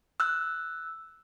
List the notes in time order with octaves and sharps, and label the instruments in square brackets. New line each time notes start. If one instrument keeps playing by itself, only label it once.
[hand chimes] E6 F#6